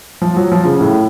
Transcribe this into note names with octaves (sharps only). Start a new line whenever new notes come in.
F3
F#3
F3
C#3
A2